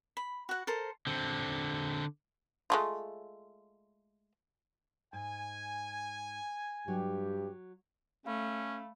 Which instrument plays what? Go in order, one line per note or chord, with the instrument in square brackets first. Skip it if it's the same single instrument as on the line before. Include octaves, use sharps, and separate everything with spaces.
[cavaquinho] B5
F#4 F#5
A4 A#4 C5
[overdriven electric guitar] D3 C4
[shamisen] G#3 A3 F4
[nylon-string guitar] G#2 [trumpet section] G#5
[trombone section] G2 G4 [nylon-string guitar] F#3
[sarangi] A3 [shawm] C#4 [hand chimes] F5 B5